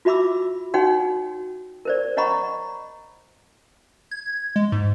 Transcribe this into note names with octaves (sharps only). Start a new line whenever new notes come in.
F4 F#4 E5 B5 D6 E6
D#4 F#4 C#5 F#5 G5 C6
A#4 C5 D5
C#5 D#5 F#5 A#5 B5 C#6
G#6
G#3
G#2